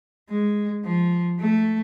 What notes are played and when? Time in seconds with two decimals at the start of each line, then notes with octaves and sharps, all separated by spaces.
0.29 G#3
0.84 F3
1.39 A3